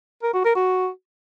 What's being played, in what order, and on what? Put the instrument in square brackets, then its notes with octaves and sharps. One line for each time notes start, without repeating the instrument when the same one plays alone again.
[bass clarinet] A#4
F#4
A#4
F#4